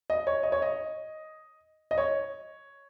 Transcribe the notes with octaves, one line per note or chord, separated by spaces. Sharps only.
D#5
C#5
D#5
C#5
D#5
D#5
C#5